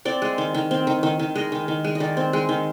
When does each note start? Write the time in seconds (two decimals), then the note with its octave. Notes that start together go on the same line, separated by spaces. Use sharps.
0.05 C4 D5
0.22 G#3
0.38 D#3
0.54 D#3
0.71 C4
0.87 D#3
1.03 D#3
1.19 D#3
1.35 G#3 D#5
1.52 D#3
1.68 D#3
1.84 G#3
1.95 D#5
2.00 D#3 D5
2.17 C4
2.33 G#3
2.49 D#3